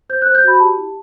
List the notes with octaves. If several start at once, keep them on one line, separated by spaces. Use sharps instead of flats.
C5 G6
C5 F#6
G6
F#4 B5
G4 A5
E4